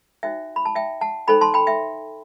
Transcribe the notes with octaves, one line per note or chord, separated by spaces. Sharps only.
D#4 F#4 C5 E5 G5
B5
A5
E5 G5
F#5 A5
D#4 A4 C5 G5 B5
A5 C6
G5 B5
E5 G5